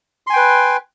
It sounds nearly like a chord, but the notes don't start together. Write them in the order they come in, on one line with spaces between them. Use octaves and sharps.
C6 G#5 G5 B4